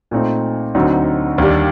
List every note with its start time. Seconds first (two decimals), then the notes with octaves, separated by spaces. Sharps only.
0.11 A#2 A3 C4 D#4
0.75 D2 D3 F#3 C4 D#4
1.38 D#2 D#3 G3 D4